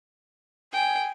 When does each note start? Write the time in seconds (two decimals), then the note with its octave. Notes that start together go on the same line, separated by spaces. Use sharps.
0.73 G5 G#5